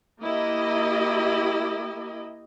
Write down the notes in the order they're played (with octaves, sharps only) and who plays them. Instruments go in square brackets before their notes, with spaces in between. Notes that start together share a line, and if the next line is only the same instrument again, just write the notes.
[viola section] A#3 E4 G4 D#5